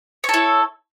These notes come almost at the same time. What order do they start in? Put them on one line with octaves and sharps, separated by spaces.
C#5 A4 E4